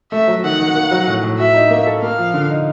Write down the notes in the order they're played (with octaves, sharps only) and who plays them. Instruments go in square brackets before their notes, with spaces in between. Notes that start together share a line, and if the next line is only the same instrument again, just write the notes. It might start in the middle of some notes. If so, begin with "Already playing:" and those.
[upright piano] A3 [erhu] E5
[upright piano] F#3
[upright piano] D#3 [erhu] F#5
[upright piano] D#3
A#3
F#3
A2
A2
[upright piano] F#4 [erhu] E5
[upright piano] D#4
A#3
A4
[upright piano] A#3 [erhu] F5
[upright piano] F3
D3
D#4